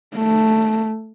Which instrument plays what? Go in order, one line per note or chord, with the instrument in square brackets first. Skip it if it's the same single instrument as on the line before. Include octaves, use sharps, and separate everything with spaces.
[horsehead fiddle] A3